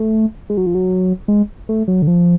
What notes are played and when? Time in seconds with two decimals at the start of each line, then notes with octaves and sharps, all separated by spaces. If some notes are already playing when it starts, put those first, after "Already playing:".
Already playing: A3
0.50 G#3
0.57 F#3
0.66 F3
0.75 F#3
1.28 G#3
1.69 A3
1.88 F#3
2.02 D3
2.08 F3